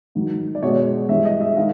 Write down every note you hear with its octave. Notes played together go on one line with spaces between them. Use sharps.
G#2 D#3 F#3
D5
B2 G#3 C#5
G2 E3 G#3 E5
D#5
E5
D#3 G#3 F5